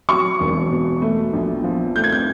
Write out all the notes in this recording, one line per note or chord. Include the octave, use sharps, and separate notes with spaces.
F#3 C#6
E1
B2
A3
A#1
F3
A3 G6
G#6
G6